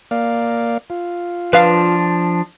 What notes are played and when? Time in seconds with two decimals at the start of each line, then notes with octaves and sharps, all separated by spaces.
0.11 A#3 D5 F5
0.90 F4
1.53 F3 D4 B4 F5